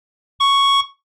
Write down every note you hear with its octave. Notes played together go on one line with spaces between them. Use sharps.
C#6